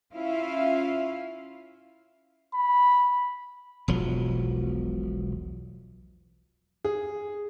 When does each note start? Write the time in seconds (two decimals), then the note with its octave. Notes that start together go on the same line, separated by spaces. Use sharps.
0.13 C#4 E4 F4 E5 F5
2.54 B5
3.88 E1 B1 F3 F#3
6.85 G#4